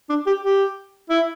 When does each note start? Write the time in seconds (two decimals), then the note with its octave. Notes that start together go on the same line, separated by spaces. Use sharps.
0.09 D4
0.26 G4
0.43 G4
1.10 E4